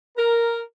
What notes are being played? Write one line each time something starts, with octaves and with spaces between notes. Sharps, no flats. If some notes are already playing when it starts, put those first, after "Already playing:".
A#4